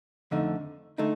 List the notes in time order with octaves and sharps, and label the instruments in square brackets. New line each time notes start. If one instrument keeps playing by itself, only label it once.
[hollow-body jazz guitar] F2 D3 A3 D#4
D3 A3 D#4